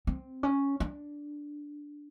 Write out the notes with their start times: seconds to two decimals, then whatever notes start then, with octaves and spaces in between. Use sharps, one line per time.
0.07 C4
0.43 C#4
0.80 D4